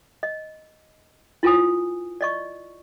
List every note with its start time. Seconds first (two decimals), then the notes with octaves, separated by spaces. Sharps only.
0.23 D#5
1.43 E4 F4 B4 G#5 D#6
2.21 D5 D#5 C#6